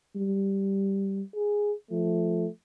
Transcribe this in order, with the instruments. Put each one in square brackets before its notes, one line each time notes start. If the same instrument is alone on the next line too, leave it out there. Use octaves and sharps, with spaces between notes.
[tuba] G3
[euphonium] G#4
[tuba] F3 [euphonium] A3